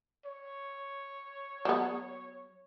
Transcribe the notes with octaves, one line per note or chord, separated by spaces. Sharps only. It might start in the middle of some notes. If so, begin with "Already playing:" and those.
C#5
F#3 B3